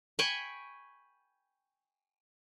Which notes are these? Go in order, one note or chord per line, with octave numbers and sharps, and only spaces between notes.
G5 G#5 B5 C#6